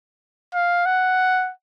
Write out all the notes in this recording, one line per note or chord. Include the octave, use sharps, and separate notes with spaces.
F5
F#5